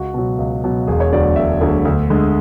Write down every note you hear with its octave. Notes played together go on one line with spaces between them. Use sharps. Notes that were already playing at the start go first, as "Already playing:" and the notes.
Already playing: C#2 F#4
B2 F#3
C#2
B2 F#3
E1 G#4
C#5
D2 D3 F#3 D5
E1 E5
D2 D3 F#3
D2
D3 G#3